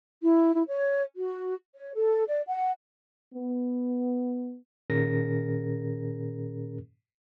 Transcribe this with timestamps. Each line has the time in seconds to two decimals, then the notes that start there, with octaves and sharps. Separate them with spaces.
0.22 E4
0.55 E4
0.68 C#5
1.15 F#4
1.76 C#5
1.94 A4
2.28 D5
2.48 F#5
3.33 B3
4.90 A#2 D#3 C#4 G#4 A#4 A#6